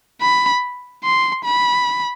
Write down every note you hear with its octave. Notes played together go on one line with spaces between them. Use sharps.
B5
C6
B5